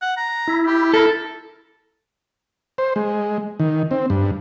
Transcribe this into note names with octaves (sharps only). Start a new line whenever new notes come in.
F#5
A#5
E4
G4
A4 A#4
C5
G#3
D#3
C4
G2